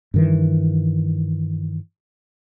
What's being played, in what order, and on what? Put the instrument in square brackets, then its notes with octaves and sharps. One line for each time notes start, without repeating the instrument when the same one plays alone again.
[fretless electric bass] G2 D#3 E3